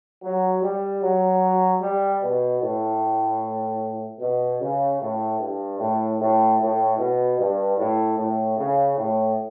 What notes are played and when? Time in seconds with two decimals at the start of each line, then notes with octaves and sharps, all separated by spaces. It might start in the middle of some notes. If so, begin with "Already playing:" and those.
0.23 F#3
0.62 G3
1.01 F#3
1.81 G3
2.21 B2
2.61 A2
4.19 B2
4.60 C#3
5.00 A2
5.39 G2
5.78 A2
6.18 A2
6.59 A2
6.98 B2
7.38 G2
7.78 A2
8.17 A2
8.57 C#3
8.97 A2